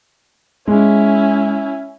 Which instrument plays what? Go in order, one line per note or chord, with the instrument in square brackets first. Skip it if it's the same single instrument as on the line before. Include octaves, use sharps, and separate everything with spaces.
[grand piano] G#3 [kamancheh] C#4 E4